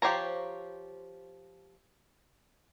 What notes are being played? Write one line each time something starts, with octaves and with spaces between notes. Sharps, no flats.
F3 G4 C5 C#5 A#5